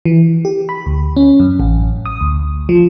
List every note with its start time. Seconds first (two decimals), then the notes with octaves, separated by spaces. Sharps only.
0.05 E3
0.45 G4
0.69 B5
0.86 D2
1.17 C#4
1.40 F#2
1.60 A1
2.06 D#6
2.21 D2
2.69 F3